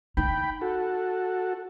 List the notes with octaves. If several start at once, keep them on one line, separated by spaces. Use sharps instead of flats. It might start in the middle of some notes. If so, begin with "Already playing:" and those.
D#4 G5 B5
F#4 A4